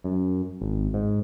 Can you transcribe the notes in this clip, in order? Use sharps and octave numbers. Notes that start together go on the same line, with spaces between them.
F#2
G#1
G#2